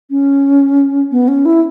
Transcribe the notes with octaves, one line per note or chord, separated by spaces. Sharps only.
C#4
B3
C#4
E4